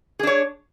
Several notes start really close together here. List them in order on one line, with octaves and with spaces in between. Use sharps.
G#4 D4 C#5